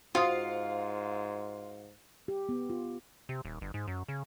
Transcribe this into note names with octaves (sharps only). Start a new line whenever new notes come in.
G#2 F4 F#4 C5 F5 C6 D#6
G4
B3
F4
C3
D#1
G1
G#2
F#2
C#3